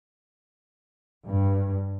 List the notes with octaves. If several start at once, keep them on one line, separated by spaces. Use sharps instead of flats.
G2